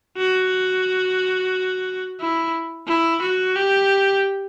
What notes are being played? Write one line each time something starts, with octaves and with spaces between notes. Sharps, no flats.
F#4
E4
E4
F#4
G4